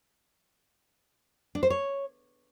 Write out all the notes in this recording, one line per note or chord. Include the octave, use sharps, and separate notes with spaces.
D4
C5
C#5